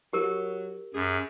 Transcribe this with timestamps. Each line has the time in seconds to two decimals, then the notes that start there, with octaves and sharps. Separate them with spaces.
0.13 F#3 G4 A#4
0.94 F#2 G#4